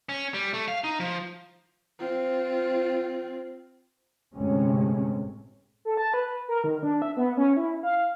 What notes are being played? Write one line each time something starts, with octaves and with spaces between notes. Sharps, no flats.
C#4
G3
A3
F5
D#4
F3
C4 F4
G1 A2 C3 G#3 C#4
A4
A5
B4
A#4
D#3
D4
E5
B3
C#4
E4
F5